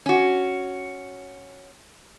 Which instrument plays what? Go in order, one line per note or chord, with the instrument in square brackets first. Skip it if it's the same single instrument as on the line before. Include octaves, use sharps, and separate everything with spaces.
[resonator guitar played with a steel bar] C#4 F#4